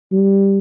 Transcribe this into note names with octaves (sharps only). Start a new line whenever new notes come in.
G3